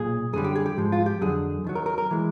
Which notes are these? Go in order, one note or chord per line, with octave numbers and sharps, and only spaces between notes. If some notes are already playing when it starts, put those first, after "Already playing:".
Already playing: B1 A#2 G#4
F#2 D3 G3 G#4
G4
G#4
G4
G#2 F3 G#3
F4
G4
F2 D3 F#3 G#4
D#2 D#3 F#3
A#4
A#4
A#4
E3 G#3